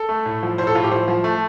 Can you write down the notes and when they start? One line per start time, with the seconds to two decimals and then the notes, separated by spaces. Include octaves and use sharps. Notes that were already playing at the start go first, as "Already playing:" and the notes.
Already playing: A4
0.09 A3
0.26 A2
0.43 F3
0.58 A2 C5
0.67 A4
0.75 A2 F4
0.84 G4
0.91 F3 C5
1.08 F3
1.24 A3